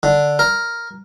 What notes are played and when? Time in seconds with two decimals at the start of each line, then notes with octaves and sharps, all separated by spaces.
0.03 D3
0.39 A#4